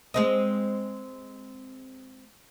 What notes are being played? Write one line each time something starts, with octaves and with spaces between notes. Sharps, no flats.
G#3 C4 D#5